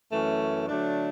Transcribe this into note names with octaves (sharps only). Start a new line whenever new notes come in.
F#2 E3 A3 C#4
D3 F#3 A3 D4